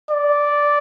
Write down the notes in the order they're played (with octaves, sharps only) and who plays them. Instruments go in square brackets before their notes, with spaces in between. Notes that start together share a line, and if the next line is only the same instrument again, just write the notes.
[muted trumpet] D5